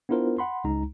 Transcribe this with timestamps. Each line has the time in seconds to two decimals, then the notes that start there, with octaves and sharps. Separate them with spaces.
0.09 B3 D4 E4 F4 A#4 C5
0.38 F#5 B5 C6
0.64 C#2 G#3 D#4 A#5